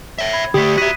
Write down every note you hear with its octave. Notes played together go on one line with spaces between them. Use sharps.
C#5 E5
B5 G#6
D3 A3 G4 D#6 B6
F#4 E5 F#6 B6 D#7